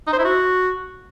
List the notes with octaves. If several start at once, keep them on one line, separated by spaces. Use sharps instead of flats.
D#4
C5
E4
F#4